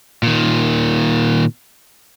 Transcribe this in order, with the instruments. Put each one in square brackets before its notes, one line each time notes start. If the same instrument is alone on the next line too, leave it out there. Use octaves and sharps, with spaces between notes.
[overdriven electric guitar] A#2 D#3